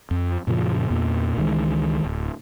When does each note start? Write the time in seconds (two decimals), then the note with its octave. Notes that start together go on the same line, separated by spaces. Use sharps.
0.11 F2
0.47 F#2 A#2 C#3 F3
0.90 E2 A#2 A#3
1.37 C#2 D#3 E3 G#3
2.04 D1